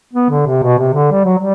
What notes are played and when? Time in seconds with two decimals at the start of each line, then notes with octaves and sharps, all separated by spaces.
0.13 B3
0.30 D3
0.46 C3
0.63 B2
0.78 C3
0.94 D3
1.11 G3
1.24 F#3
1.38 G3